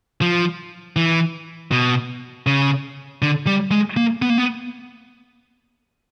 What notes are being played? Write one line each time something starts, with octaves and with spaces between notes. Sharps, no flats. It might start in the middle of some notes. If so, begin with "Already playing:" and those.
F3
E3
B2
C#3
D3
G3
G#3
A#3
B3
A#3
B3